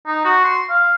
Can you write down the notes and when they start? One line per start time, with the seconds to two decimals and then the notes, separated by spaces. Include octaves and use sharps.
0.07 D#4
0.25 F#4
0.45 C6
0.70 F5